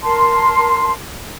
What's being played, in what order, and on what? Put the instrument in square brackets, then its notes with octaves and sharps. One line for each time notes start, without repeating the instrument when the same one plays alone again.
[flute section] A#4 A5 C6